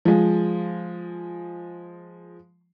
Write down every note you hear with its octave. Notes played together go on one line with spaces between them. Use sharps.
F3 G#3